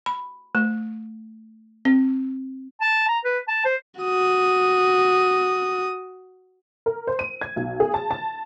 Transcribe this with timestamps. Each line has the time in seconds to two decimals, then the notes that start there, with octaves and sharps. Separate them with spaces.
0.06 B5
0.55 A3
1.85 C4
2.81 A5
3.08 A#5
3.25 B4
3.48 A5
3.65 C5
4.01 F#4 D#6
6.86 A#4
7.07 C5
7.19 D#7
7.41 G#6
7.56 B1
7.80 G#4
7.94 A5
8.11 A5